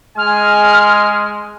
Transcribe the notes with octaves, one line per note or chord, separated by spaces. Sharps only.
G#3 G#5 F6